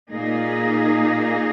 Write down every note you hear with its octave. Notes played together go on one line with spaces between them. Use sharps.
A#2 A#3 D#4 G#4 D#5